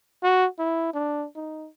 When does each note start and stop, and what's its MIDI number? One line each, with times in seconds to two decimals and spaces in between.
0.23 0.46 66
0.59 0.92 64
0.94 1.26 62
1.35 1.67 63